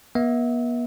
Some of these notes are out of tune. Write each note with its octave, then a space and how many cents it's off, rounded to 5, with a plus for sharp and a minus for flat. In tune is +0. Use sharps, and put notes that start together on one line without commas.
B3 -40 E5 -25